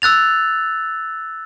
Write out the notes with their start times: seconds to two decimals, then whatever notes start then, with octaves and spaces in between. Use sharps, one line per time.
0.02 E6 F#6 A6 F7